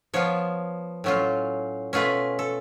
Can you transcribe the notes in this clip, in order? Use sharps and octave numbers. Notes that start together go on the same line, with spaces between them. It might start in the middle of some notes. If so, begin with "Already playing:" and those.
F3 B3 F4 C#5
A2 F#3 C#4 F4
B2 A3 C#4 F4 B4
A4